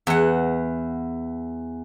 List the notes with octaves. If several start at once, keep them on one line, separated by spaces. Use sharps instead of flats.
E2 F#5